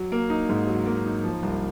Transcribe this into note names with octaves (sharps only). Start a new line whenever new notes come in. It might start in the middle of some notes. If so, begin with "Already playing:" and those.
Already playing: F#3
A#3
D#4
G#2
F#3
A#3
D#4
F3
C2